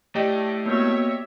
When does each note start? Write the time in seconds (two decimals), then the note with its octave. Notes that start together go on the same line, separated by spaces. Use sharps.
0.15 A2 G4 D5 D#5
0.66 A#3 B3 F#4 C#5 E5